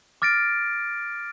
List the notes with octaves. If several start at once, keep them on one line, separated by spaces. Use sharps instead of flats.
D6 F6 A6 A#6 D7